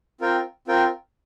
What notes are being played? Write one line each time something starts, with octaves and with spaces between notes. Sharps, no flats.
C4 F4 A#4 G5
C4 F4 A#4 G5